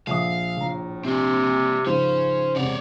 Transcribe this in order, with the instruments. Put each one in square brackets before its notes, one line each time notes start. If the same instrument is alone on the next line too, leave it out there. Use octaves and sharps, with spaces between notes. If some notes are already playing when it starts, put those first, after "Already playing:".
[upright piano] A#1 E5 D#6 [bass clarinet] D3 [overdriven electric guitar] F5
[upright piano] A#1 A#5 [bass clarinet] A2
[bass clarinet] C3 [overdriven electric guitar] C4 D4
[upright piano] G#2 C#3 F3 [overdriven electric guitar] C#4 [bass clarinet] C5
[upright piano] E1 C3 [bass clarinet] B3 [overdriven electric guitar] C#5 D5